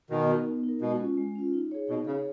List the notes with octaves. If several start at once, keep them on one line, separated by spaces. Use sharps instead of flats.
B2 D#3 B3
D#4 A#4
B3
D#4
A#4
B2 G#3
C#4 F4
G#3
C#4 F4
D#4
G#4 C#5
B2 D#4
C#3 G#4 C#5